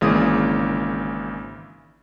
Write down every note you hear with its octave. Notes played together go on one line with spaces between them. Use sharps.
G#1 C#3 E3 A#3 D#6